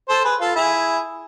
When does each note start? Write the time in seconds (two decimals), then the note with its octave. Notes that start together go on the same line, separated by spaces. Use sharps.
0.09 A4 C5
0.24 G#4 B4
0.40 F4 A4
0.56 E4 G#4